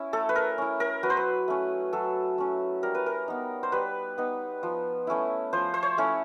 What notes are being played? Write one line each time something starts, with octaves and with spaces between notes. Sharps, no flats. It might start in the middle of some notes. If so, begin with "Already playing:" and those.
Already playing: C#4 E4
A3 A4
B4
A#4
C#4 E4
A#4
F#3 B4
C5
B4
A3 C#4
F#3 A4
A3 C#4
G3 A#4
B4
A#4
B3 D#4
C5
G3 B4
B3 D#4
F3
A3 C#4 E4
F3 C5
C5
C#5
A3 C#4 E4